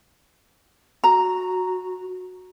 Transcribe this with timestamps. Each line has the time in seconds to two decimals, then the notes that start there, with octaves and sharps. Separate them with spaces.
1.04 F#4 A#5